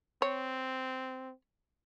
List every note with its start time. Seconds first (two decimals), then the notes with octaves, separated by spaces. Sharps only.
0.22 C4 C#5